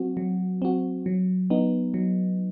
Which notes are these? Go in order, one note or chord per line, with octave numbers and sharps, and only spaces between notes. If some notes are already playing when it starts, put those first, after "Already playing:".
Already playing: F#3 C4 F#4
F#3
C4 F#4
F#3
B3 D#4
F#3